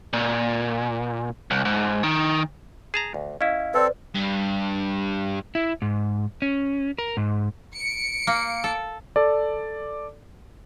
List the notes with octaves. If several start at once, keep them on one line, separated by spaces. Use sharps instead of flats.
A#2
C2
G#2
D#3
G#4 A5 A#5
D2
C#4 E4 D#5 F5
C4 A4 B4 C5 D5
G2
E4
G#2
C#4
A#4
G#2
C#7 D7
A#3
A4
A4 D5